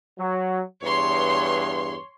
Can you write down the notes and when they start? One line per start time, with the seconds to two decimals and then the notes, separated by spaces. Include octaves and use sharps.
0.18 F#3
0.83 E2 G2 C#5 C6